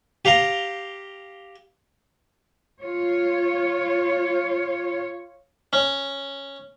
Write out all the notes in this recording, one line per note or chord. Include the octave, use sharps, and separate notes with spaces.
G4 F5 G5 A#5
F4 C#5
C#4